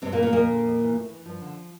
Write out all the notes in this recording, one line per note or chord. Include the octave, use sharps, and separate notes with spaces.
G2 C3 C4
A#2 A#3
E3
A#2 A#3
F2 A#2 A#3
D3
F2
E3
A2
E3
G2 F3
D3